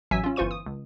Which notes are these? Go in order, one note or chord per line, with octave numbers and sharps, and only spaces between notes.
A1 F#3 E5 G#5 E6 B6
C#4 F4
G1 E3 F4 C5 C#6 D#7
D#6
C#2